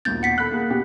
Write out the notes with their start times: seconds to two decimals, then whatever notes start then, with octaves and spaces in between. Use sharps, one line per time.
0.05 A#1 D#2 B2 G6 A6
0.23 F#5 B6 C7
0.38 A4 B5 F#6
0.52 A#3 G#4
0.70 B2 G4